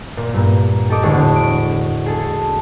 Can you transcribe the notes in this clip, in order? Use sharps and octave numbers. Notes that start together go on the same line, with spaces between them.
A#2
G2 A#2
G4 A4 D#5 D6
E1 A2 D3 G#4 C#5 D5
D7
G#4 A4